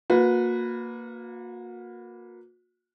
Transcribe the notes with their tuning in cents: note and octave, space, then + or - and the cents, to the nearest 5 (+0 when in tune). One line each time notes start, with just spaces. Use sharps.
A#3 +0 F#4 -40 B4 +0